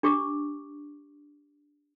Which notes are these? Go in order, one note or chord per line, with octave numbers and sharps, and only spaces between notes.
D4 G4 C#6 D6